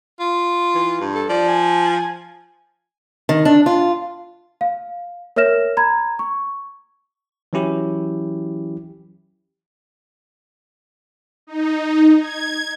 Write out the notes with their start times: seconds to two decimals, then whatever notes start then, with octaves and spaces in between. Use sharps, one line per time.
0.20 F4
0.75 E3
1.01 G2
1.15 A4
1.29 F3 D5
1.48 G#5
3.29 D#3
3.45 D4
3.66 F4
4.61 F5
5.36 A#4 C#5 E5 F6 A#6 E7
5.77 A#5 B5 G#6
6.19 C#6
7.53 E3 F#3 C#4 E4 G4
11.47 D#4
12.19 G#6